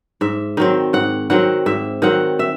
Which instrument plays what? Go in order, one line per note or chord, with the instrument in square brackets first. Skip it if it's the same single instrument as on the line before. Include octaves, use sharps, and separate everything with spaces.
[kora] G#2 E5
D#3 F#3 C4
G#2 F#5
D#3 F#3 C4 F#5
G#2 E5
D#3 F#3 C4 F#5
E5